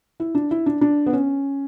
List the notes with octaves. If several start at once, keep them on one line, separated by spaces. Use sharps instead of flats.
E4
D4
E4
D4
D4
B3
C#4